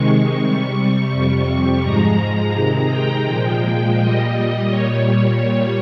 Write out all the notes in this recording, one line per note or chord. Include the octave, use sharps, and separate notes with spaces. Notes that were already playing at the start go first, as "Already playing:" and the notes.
Already playing: C3 D#3 G#3 C#6
C3 G3 C#6
F2 C3 G3 C#6
G#2 F3 G#3 A#5
C3 D#3 G#3
G5
A#2 F3 G#3
A#2 G3 D#5
A#2 G3 C#5